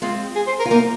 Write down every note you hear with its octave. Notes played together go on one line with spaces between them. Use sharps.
G#3 C4 F4
G#4
C5
A#4
F4
A#3 D#4 A#4